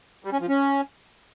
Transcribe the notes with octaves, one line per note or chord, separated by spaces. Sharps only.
G3
C#4
F3
C#4